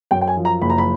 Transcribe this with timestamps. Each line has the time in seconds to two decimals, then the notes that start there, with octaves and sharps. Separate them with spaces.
0.11 F#2 G5
0.21 G5
0.27 G#5
0.36 F3
0.45 A#5
0.62 F#1 B5
0.70 A#5
0.78 B5